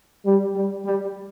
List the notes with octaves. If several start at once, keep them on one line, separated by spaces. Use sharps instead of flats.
G3
G3
G3